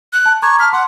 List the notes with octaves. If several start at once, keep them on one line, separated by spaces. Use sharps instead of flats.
F#6
A5
A#5 C#6 D6 G#6
A5 F6 B6
F#5 C6